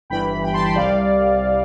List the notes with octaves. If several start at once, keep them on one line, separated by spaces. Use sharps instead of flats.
G1 G2 E3 G5 B5
G5 B5
A5 C6
G5 B5
C2 C3 G3 D5 F5